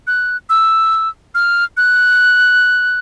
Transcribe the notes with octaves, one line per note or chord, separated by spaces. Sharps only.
F#6
E6
F6
F#6